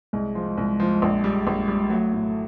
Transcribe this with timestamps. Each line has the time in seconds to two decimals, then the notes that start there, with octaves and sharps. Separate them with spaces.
0.13 C2 G#3
0.35 F3
0.57 C2
0.80 F3
1.02 A#1
1.24 G3
1.47 A#1
1.68 G3
1.90 F#3 A3
2.13 A2